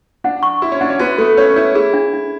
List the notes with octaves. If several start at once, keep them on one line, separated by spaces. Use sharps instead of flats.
D4 F#5
C#6
E4 F#4
C#4
D4 F#5
C#4
B3 F#4
A3 A4
C#4 C#5
E4 C#5
E4 G#4
D4
D4